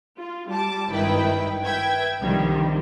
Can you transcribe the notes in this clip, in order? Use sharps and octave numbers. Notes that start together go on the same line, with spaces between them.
F4
G3 A5 D6
G#1 G2 D#3 E4 B4 G5
B4 E5 G5 G#6
C2 D3 D#3 F3 G3